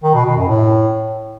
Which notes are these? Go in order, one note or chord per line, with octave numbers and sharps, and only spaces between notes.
D#3
B2
B2
F#2
A2